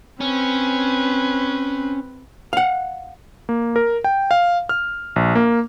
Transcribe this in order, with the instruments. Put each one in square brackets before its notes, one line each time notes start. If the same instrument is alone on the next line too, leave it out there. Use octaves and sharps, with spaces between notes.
[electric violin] C4 B4 [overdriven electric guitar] C#4
[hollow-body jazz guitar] F5 F#5
[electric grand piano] A#3
A#4
G5
F5
F6
A#1
A#3